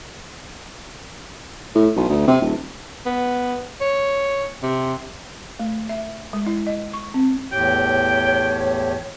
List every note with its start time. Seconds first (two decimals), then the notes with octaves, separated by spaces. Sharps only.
1.75 A2
1.97 B1
2.10 D2
2.28 C3
2.41 D#1
3.06 B3
3.81 C#5
4.63 C3
5.60 A3
5.89 E5
6.33 G#3
6.46 E4
6.67 D#5
6.93 C#6
7.14 C4
7.52 E2 A2 G4 C#5 G5